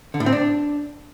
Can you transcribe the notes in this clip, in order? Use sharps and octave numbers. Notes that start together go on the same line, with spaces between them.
D3
A2
C4
D4